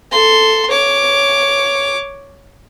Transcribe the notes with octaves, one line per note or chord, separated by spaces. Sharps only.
A4 C6
C#5 D6